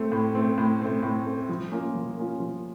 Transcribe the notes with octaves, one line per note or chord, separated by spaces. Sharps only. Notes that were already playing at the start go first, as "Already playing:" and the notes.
Already playing: A3 C4
A2
A3 C4
A2
A3 C4
A2
A3 C4
F3
A#3 C#4 F4
F3
A#3 C#4 F4
F3